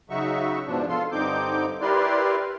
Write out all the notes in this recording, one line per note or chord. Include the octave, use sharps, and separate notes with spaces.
C#3 F#3 D#4 F#4 E5 C#6
G#2 B2 F3 D4
F4 A4 C6
G2 D3 C4 D#4 D6 G6
E4 G4 A#4 B4 D5 C6